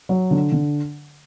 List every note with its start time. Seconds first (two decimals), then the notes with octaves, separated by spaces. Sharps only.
0.09 F#3
0.31 D3
0.52 D3